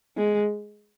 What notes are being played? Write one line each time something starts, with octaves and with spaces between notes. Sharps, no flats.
G#3